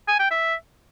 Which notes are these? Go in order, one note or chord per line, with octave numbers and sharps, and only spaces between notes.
G#5
G5
E5